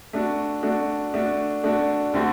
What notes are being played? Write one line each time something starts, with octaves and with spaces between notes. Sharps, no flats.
A3 D4 F#4
A3 D4 F#4
A3 D4 F#4
A3 D4 F#4
D3 A3 C4 F#4